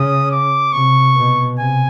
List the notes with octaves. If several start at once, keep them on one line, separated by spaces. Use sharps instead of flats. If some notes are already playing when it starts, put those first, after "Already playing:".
Already playing: C#3 D#6
D6
C3 C#6
B2
C3 G#5